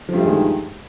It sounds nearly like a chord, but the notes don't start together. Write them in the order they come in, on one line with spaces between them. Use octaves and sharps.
F3 G2 A3 G#3 D#3